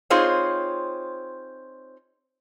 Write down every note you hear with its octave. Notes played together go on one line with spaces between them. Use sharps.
C4 D#4 F4 G#4 C5 C#5